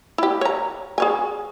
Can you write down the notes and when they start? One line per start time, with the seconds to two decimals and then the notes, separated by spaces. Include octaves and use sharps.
0.18 E4 G4
0.41 C#5 A#5
0.98 G#4 C#5 G#5